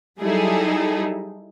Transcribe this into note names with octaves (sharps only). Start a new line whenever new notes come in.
F#3 G3 D#4 E4 G#4 A4